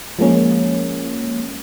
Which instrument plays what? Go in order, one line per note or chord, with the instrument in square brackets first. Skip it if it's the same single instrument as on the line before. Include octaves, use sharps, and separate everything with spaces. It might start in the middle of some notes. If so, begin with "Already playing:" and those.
[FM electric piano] F3 G#3 A#3 C#4